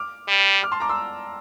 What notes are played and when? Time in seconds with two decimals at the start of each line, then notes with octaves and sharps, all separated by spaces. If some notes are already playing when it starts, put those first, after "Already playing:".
Already playing: D6 F6
0.28 G3
0.63 D6 F6
0.72 A5 C6
0.80 A#5 D6
0.89 C6 E6